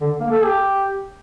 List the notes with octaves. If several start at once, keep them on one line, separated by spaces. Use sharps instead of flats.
D3
A#3
A4
G4